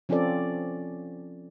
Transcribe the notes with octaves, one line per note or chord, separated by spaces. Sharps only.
F3 C4 C#4 F4 A4 D5